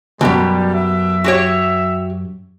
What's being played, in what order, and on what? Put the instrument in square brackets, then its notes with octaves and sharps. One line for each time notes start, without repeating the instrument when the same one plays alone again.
[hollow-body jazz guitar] C#2 F#2 [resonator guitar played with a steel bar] B2 G4 [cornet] G3
[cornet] E5
[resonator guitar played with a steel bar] F#4 G4 C#5